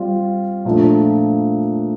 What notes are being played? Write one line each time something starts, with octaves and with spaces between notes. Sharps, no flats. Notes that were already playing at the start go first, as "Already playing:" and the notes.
Already playing: G3 C4 F4
A#2 F3 A3 D4